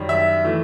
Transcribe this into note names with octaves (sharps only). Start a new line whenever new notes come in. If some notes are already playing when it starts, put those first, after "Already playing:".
Already playing: F#2 D#3 G3
E5
E3 A3